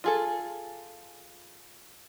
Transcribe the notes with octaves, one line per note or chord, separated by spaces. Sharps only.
F4 G#4 A4